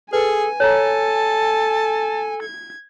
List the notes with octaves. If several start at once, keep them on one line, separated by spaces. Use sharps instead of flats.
G#4 A4 B4 G#5
A4 C#5 A5 A#5
G#6